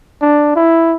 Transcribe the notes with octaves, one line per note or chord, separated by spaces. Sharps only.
D4
E4